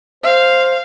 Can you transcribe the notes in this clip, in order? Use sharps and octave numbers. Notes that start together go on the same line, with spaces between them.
C5 F5